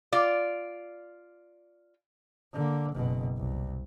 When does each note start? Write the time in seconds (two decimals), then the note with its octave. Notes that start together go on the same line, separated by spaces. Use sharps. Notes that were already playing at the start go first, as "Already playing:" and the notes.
0.13 F4 D5
2.53 D3 A#3
2.92 F#1 B2
3.37 C2